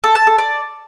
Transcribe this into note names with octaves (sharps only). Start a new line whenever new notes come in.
A4
A5
A4
D5